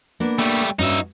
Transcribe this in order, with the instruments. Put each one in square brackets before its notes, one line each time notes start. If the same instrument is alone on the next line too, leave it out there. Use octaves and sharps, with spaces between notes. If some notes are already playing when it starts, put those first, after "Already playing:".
[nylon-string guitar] A#3 B3 D4
[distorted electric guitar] G3 A3
[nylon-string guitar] G2 C#4 F#4 [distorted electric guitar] D#4 E5